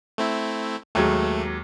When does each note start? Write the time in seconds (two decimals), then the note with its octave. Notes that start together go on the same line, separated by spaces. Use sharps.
0.18 A3 C4 E4
0.95 D#2 F#3 G#3 A3